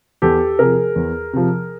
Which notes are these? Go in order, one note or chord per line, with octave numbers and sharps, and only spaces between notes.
E2 G4 A4
C3 F3 G#4 A#4
E2
C3 F3